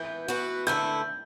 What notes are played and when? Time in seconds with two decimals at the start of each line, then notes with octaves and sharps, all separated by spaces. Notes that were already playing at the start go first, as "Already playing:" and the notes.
Already playing: E3 B3 G6
0.28 E3 B3 F#4
0.67 D3 A3 E4 G6